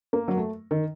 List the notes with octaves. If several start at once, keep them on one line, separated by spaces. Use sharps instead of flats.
A#3
F#3
A3
D#3